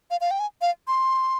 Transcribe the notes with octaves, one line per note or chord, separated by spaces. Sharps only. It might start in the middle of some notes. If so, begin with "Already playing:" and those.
F5
F5
G5
G#5
F5
C6